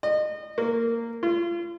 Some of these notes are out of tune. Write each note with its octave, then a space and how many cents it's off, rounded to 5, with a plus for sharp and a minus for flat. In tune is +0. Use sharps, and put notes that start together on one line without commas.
D#5 -30
A#3 -15
F4 -35